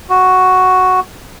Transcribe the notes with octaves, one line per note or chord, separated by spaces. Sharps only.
F#4